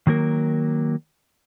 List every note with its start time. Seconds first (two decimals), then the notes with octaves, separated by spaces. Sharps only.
0.07 D#3 F#3 A#3 A#4